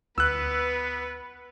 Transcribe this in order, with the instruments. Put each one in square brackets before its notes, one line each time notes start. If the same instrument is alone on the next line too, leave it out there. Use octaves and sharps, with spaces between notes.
[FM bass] D2 [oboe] B3 [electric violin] B4 [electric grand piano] E6 F#6